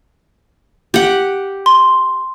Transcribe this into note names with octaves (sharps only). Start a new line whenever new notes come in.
G4 F#5
C6